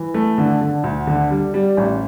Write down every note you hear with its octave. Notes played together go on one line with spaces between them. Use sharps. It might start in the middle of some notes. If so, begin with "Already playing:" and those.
Already playing: E3
A3
D3
D3
D2
D3
G3
G3
A1